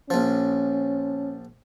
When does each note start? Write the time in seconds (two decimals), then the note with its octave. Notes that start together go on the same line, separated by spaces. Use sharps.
0.10 A#1 F3 C#4